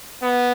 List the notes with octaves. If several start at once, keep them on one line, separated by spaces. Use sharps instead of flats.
B3